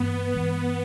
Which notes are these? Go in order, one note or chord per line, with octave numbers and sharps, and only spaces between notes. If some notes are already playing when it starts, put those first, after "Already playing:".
Already playing: G2 E3 G#3 B3
G2 E3 G#3